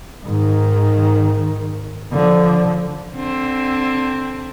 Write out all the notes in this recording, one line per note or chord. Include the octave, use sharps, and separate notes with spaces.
G#2 D#3
D3 F3
D3 C4